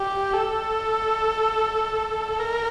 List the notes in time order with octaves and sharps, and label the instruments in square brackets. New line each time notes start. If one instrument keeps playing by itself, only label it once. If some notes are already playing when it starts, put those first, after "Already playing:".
Already playing: [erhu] G4
A4
A#4